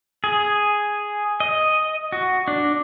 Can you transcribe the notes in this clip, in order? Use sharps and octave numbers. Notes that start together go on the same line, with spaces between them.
G#4
D#5
F#4
D4